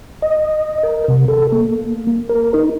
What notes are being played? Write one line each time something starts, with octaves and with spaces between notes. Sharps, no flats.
D#5
A#4
C3
A4
A#3
A#4
D#4